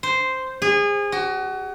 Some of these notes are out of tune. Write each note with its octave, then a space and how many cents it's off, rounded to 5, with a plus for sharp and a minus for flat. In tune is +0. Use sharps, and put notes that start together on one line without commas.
C5 -5
G#4 -30
F#4 +25